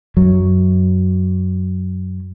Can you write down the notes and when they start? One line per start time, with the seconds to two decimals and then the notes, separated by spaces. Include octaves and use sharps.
0.17 F#2 F#3